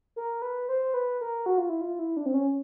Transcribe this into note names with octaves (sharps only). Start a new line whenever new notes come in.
A#4
B4
C5
B4
A#4
F#4
F4
E4
F4
E4
D4
C4
C#4